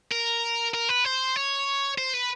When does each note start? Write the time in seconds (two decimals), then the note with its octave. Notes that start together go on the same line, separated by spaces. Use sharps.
0.11 A#4
0.74 A#4
0.89 B4
1.05 C5
1.36 C#5
1.98 C5
2.14 B4